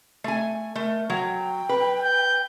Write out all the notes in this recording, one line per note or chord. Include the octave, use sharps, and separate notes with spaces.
A3 G#5
A3 A#4
F#3 G5
B4
G6